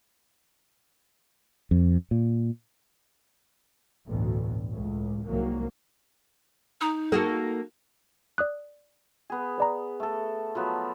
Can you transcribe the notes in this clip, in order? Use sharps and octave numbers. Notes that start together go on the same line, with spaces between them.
F2
A#2
A1 D2 G2 B2
C#2 A2
C2 G#2 F#3 A#3
D#4 A#5 D#6
A#3 F#4 G#4 A4
D5 D#6 F#6
B3 G#4
B4 D5 A#5
A3 A4
F3 F#3 B3